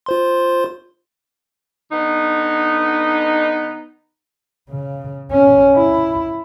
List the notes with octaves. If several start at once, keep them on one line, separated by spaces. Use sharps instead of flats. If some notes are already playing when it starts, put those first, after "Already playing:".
F4 C5 C6
D3 B3 D#4
C#3
C#4
E4